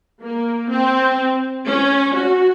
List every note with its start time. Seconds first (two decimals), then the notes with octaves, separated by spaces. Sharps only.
0.21 A#3
0.70 C4
1.66 C#4
2.14 F#4